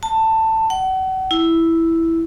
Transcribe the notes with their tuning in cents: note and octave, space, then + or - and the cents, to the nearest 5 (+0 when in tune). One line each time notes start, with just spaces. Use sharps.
A5 +15
F#5 +35
E4 +0